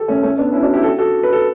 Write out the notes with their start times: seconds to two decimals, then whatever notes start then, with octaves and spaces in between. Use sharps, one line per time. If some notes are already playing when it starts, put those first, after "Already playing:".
Already playing: G4 A4
0.08 A3 C#4
0.23 A3 C#4
0.38 B3 D4
0.53 C#4 E4
0.63 D4 F#4
0.74 E4 G4
0.83 F#4 A4
0.98 F#4 A4
1.23 B4
1.33 A4